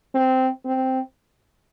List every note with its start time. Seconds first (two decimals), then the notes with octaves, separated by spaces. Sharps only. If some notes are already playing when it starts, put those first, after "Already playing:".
0.14 C4
0.65 C4